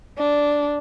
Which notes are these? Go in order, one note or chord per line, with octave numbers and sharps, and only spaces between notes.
D4